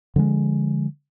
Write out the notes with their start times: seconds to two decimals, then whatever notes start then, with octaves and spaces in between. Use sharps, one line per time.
0.16 D3 F3 G3 G#3